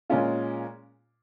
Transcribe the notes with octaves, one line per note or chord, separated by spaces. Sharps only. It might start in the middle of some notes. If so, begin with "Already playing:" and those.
A#2 G#3 C#4 F4